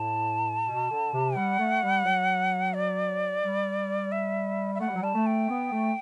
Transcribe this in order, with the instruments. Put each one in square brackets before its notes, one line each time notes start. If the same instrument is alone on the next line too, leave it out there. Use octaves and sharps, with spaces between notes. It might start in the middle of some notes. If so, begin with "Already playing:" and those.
Already playing: [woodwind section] A2 [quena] A5
[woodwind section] B2
D3
C3
[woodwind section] G3 [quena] F#5
[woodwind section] A3
G3
F#3
[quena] D5
[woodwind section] G3
[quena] E5
E5
[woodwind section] A3 [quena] F#5
[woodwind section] G3
F#3
[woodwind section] G3 [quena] A5
[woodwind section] A3
[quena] G5
[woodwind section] B3
A3